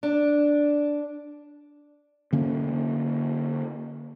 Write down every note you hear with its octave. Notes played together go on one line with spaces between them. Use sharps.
D4
D3 A#3 C#4